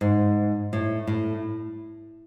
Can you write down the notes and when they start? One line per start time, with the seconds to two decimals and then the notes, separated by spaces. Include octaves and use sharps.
0.01 G#2
0.73 A2
1.07 A2